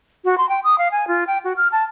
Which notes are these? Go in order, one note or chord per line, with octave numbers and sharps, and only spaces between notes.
F#4
C6
G5
D#6
F5
G#5
F4
G5
F#4
F6
A5